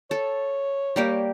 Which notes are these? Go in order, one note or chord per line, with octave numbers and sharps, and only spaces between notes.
A4 C#5
G3 A#3 G4